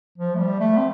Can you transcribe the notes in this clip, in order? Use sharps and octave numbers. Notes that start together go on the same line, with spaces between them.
F3
A3
G3
A3
C4